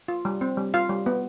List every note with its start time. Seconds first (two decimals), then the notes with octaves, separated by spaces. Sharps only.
0.08 F4
0.25 G3
0.41 C4
0.57 G3
0.74 F4 F5
0.90 G3
1.06 B3